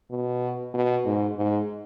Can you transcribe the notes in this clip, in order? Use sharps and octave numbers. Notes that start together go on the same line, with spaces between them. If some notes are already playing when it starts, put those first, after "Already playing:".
B2
B2
G#2
G#2